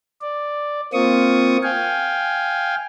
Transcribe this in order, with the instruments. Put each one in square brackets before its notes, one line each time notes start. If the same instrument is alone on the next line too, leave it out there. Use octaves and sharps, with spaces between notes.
[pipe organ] D5
A#3 C4 F4 C#6 D#6
F5 G5 G#5